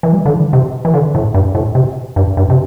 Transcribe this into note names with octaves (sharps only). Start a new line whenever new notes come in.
E3
G3
D3
E3
C3
E3
D3
A2
G2
A2
C3
G2
G2
C3